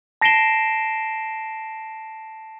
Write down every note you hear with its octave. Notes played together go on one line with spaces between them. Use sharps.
A5 A#6 C7 D7 E7 G7